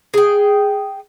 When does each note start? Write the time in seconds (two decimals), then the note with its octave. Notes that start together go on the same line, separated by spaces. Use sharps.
0.14 G#4 G5